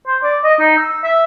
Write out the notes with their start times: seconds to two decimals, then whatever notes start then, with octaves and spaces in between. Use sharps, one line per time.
0.07 C5
0.23 D5
0.44 D#5
0.59 D#4
0.77 E6
1.04 E5